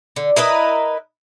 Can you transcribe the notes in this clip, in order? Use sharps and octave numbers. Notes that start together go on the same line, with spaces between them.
D3
E4 A#4 B4 D#5